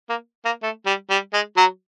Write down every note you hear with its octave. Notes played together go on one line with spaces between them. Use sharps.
A#3
A#3
A3
G3
G3
G#3
F#3